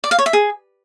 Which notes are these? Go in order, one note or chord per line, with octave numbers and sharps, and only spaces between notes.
D5
F5
C#5
E5
G#4